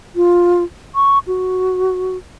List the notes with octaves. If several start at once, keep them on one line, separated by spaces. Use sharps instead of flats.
F4
C#6
F#4